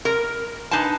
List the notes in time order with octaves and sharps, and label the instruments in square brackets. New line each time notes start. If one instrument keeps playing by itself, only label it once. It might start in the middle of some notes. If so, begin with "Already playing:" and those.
[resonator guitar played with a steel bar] A#4
D4 D#4 B4 G#5 A5